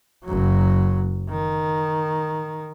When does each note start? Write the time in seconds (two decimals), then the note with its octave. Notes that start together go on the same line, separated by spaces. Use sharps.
0.24 F#1 F#3
1.29 D#3